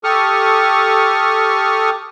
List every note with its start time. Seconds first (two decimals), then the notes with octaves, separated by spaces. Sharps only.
0.04 G4 A4 C#6 D#6 F6